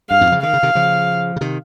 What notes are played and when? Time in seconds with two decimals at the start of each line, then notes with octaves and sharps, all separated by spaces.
0.10 G2 F5
0.21 F2 G#2
0.32 C#3 F3
0.43 D#3 F5
0.54 C#3
0.63 C3 D#3
0.75 C#3 F3
1.36 C#3
1.41 C3 D#3